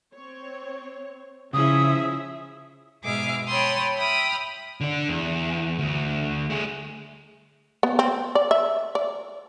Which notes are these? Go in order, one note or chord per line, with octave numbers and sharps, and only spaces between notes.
C4 C#5
C#3 F3 C#4 E4 G#4 E5 D#6
G#2 B2 G#4 E5 D6 F6
C#5 G5 A5 B5 C6 D#6
E5 G5 B5 D#6 F6
D3 D4
E2
D2
A3 G#4
B3
C4
D5
E5
D5